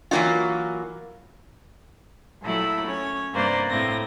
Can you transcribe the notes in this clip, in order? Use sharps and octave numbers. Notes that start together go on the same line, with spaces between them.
E3 F#3 A#3 D#4 F4
A#2 F#3 A3 E4 A4 B5
C#4 C#5
G2 C3 A#3 B4 C5 D5
A2 A#3 C4 A#6